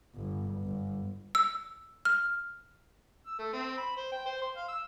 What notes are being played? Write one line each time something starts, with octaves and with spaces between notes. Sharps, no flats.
G1
G1
E6
F6
E6
A3
C4
B5
C5
G5
C5
C6
F5
E6